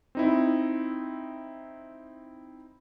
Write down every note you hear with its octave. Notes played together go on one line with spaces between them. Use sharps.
C4 D#4 E4